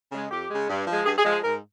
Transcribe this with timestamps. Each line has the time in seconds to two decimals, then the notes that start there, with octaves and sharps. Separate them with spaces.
0.12 C#3 G#3
0.31 F2 G4
0.50 C#3 G#3
0.69 G2
0.87 F3 G#3
1.06 G2 G#4
1.18 G#4
1.25 F3 G#3
1.31 G#4
1.43 G#2 A#4